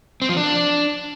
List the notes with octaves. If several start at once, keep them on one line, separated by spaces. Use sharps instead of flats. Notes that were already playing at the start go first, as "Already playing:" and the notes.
C4
F3
D4